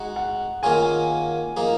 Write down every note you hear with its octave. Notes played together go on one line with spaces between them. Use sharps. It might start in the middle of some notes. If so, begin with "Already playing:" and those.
Already playing: G#3 D#4 F#4 F#5
F#5
D#3 A#3 C#4 F4 G#4 G#5
F3 A#3 D#4 G#4